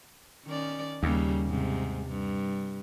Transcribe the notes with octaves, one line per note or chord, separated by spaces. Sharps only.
D#3 C#4 D5
D#2 C#3 G3 A#3
G#2 C3
G2